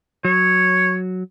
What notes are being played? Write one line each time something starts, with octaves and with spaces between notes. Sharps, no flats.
F#3 C#5